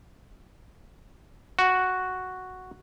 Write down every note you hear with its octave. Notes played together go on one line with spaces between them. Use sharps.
F#4